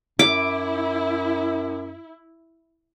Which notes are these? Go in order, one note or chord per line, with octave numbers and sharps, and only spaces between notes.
F#2 E4 D6